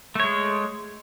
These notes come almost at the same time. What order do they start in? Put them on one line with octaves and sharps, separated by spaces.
A3 C#5 G#3